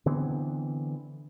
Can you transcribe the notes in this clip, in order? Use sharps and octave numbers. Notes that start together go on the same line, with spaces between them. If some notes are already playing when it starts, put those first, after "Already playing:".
D3 E3 B3 C4